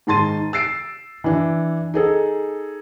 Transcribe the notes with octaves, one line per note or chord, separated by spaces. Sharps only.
G#2 D#3 A5 C6 A6 D#7
E6 A6 C7 D7
E3 D4
D#4 G#4 A4